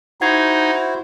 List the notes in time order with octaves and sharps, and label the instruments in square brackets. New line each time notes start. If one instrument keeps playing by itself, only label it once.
[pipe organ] D#4 [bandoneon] E4 F#4 C5 [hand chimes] F#5 G#6 C7